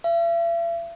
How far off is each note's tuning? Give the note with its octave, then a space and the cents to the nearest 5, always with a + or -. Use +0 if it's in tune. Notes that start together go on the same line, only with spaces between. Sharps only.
E5 +45